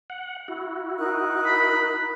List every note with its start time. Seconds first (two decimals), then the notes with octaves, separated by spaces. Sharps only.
0.10 F#5
0.48 E4 F#4
0.98 D#4 A#4 F#6
1.45 B5